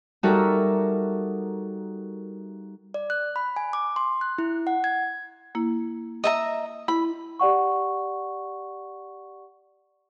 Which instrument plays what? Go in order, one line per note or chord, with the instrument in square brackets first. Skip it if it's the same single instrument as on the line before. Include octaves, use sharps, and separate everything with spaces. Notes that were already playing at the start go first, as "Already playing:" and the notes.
[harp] G3 D#4 F#4 A4 A#4 E5
[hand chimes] D5
F#6
B5
G#5
D6
C6
F#6
E4
F#5
G#6
[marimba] A#3 E4
[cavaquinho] D#5 E5 A#5
[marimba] E4 [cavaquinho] B5
[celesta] G4 D5 F#5 C#6